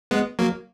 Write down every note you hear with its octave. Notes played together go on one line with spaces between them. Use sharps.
G#3 B3
F#3 A#3